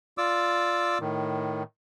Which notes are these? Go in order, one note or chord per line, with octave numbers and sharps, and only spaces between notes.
F4 D5 D6 E6
A2 D#3